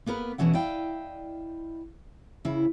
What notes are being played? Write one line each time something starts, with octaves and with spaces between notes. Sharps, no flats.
A#3 B3 A#4 B4
B2 D#3 E3 C#4 E4 F#5
E4 D5 D#5 F5 G5
C#3 E4